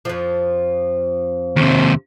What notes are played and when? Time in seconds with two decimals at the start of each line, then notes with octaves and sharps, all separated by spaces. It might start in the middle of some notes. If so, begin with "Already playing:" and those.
0.05 F2 F3
1.56 D#2 C3